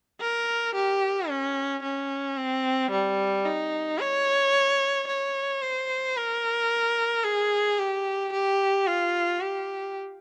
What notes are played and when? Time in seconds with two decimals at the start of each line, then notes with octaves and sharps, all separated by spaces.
0.20 A#4
0.75 G4
1.29 C#4
1.83 C#4
2.37 C4
2.91 G3
3.46 D#4
4.00 C#5
5.08 C#5
5.62 C5
6.16 A#4
7.24 G#4
7.79 G4
8.33 G4
8.87 F4
9.41 G4